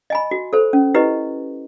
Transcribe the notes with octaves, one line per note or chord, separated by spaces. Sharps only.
D#5 G#5 B5
F#4
A4 C5
C#4
E4 G4 B4 D#5